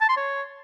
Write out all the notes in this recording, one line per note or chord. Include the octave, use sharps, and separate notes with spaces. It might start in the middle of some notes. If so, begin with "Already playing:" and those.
A5
C6
C#5